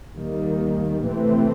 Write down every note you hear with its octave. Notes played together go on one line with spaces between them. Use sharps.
D#2 D#3 G3 A#3
C3 E3 A3 C4